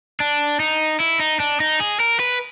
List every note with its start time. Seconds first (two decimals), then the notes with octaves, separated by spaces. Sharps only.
0.20 D4
0.60 D#4
1.00 E4
1.20 D#4
1.40 D4
1.60 D#4
1.80 G#4
2.00 A#4
2.20 B4